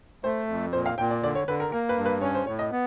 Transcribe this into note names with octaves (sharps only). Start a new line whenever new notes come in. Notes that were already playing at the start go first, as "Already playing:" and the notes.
A3 C5
F2
A#2 C5
F5
A#2 G5
D5
D3 D5
C#5
D3 B4
A#4
A#3 A#4
B4
G2
B4
C#4 C#5
C5
A2 C#5
D#5
B3